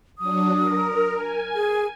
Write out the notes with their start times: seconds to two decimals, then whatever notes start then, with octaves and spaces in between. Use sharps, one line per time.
0.18 F#3 D4 D#6
0.56 A#4
1.15 G#5
1.55 G#4